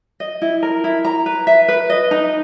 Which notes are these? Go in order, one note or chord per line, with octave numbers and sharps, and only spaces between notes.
D#5
E4
A#4
E4
A#5
B4
E5
B4
D#5
D#4